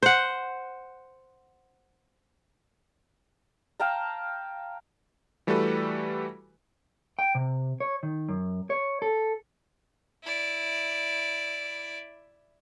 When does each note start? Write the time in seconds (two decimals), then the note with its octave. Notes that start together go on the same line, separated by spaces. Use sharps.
0.03 C5 F#5
3.80 F5 G5 A5 A#5
5.47 E3 G3 A3 F#4 A4 B4
7.19 G5
7.35 C3
7.80 C#5
8.03 D#3
8.29 F#2
8.70 C#5
9.02 A4
10.23 E4 D5